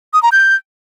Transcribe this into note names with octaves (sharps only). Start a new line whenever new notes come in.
D#6
A#5
G6